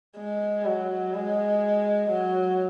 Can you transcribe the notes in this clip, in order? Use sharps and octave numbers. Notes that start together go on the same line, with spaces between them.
G#3
F#3
G#3
F#3